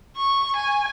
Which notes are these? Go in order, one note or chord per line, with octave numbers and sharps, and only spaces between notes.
C#6
G#5